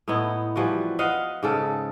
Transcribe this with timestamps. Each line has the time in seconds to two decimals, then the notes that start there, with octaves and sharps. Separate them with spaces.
0.08 A2 B3 D#4 E4
0.56 E3 F3 G3 F#4
0.99 B4 D#5 F5 F#5
1.43 G#2 C#3 A4